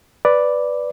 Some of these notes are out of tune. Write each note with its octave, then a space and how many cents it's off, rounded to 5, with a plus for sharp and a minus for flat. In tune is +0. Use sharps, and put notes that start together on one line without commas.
B4 +0 D5 +0